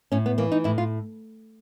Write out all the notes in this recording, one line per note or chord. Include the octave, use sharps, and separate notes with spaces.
A2 C#4
B3
E3 A#3
D#4
A2 E4
F4